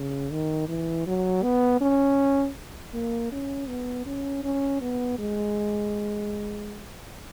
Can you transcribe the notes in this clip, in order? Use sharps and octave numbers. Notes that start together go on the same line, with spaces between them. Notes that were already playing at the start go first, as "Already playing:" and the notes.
Already playing: C#3
D#3
E3
F#3
B3
C#4
A#3
C#4
B3
C#4
C#4
B3
G#3